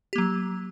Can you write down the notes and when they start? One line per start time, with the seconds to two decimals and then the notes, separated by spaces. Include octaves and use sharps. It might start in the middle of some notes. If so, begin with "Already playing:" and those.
0.13 G4
0.16 A#3
0.18 F#3